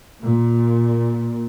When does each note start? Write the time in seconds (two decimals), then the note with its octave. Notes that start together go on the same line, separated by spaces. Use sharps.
0.22 A#2